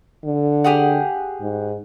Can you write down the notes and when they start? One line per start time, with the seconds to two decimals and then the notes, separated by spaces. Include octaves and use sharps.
0.25 D3
0.64 G4 G#4 F#5
1.41 G#2